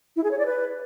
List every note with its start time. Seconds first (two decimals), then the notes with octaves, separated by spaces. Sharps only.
0.16 E4
0.24 G#4
0.31 C#5
0.39 D5
0.46 B4